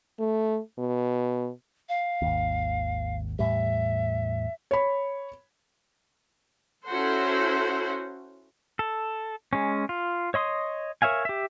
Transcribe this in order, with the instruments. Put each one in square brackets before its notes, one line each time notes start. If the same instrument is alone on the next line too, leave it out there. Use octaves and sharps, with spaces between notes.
[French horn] A3
B2
[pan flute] F5
[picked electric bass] G#1 D#2
[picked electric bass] E2 A2 G3 [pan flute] E5
[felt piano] C#5 B5
[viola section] C#4 E4 F#4 A4 C5 F#5
[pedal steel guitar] A4
G#3 C#4
F4
C#5 D#5 C6 D#6
A#4 C#5 E5 F5 G#5
G4 E5